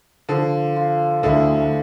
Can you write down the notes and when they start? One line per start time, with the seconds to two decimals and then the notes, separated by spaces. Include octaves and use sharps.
0.29 D3 F3
0.76 F4
1.23 D2 D3 E4